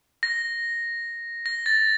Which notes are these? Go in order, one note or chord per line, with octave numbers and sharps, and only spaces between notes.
A#6
A#6
A6